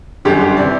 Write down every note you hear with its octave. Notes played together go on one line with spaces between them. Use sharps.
G1 F#2 D3 G4
G4
C3 E3 D5